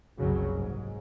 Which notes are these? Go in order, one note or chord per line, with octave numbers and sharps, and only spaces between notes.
F#1 C2 C#3 F#3
G#2